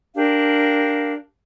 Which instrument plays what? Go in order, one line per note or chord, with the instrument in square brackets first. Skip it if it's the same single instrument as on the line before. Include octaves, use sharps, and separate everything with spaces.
[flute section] D4 G4 A#4 F5